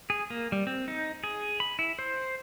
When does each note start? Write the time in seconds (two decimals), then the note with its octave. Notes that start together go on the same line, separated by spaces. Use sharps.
0.10 G#4
0.30 A#3
0.52 G3
0.67 C4
0.88 D#4
1.24 G#4
1.60 B5
1.79 E4
1.99 C5